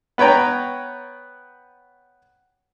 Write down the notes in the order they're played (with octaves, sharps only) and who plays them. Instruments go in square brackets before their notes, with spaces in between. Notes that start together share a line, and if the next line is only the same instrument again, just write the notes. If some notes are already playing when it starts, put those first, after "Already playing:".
[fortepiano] B3 B4 C#5 G5 A#5